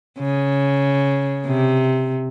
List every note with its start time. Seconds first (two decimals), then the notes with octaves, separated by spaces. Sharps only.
0.19 C#3
1.46 C3